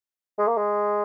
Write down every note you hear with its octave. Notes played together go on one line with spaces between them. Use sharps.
G#3
A#3
G#3